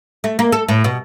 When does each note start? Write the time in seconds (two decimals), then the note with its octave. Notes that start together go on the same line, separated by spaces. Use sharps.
0.24 A3
0.39 A#3
0.52 A4
0.69 A2
0.84 B2